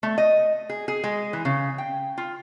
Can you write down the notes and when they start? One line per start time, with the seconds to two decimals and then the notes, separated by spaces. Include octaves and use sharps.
0.03 A3
0.18 D#5
0.69 G#4
0.88 G#4
1.04 G#3
1.33 E3
1.45 C#3
1.78 G5
2.18 F4